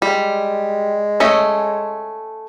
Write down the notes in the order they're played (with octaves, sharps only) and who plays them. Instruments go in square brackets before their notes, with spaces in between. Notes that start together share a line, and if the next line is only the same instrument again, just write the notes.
[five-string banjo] G3 [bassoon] G#3
[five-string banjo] A3 C#4 D#5